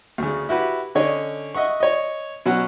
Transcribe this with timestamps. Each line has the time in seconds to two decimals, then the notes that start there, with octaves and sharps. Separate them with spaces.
0.18 D2 C#3
0.49 E4 F#4 G4 B4
0.95 D3 C#4 C#5 D#5
1.55 D#5 E5 F#5 C#6
1.80 C#5 D#5
2.46 B2 F#3 C#4 F#5